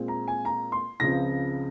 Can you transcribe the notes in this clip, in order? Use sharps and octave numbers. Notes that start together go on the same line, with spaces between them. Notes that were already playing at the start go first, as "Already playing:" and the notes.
Already playing: A#2 G#3 C4
A#5
G#5
A#5
C6
C#2 C#3 F3 C4 A#6